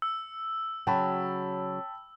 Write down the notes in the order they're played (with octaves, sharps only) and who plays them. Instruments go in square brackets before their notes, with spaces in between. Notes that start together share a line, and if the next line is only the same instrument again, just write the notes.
[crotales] E6
[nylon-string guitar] C#3 F#3 F#4 [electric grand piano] G5 A5 B5